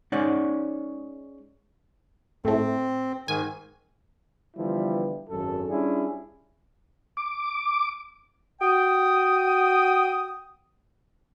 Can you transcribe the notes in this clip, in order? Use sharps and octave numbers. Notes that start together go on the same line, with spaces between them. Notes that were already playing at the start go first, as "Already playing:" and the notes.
G#3 C#4 D#4 C5 D5 F#5
A2 A3 C4
G#2 D#3 G#5
D3 E3 F3 G3 B3 E4
G#1 F#2 A4
G3 C#4 D4 E4 F4 G#4
D6
F#4 G5 D#6